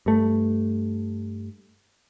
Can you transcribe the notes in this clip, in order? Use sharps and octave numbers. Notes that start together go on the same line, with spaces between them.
G2 A3